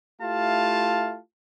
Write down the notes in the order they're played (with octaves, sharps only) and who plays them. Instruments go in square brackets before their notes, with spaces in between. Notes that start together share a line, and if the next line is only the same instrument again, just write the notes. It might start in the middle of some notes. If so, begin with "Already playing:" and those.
[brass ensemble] A3 E4 F4 G4 F5 A5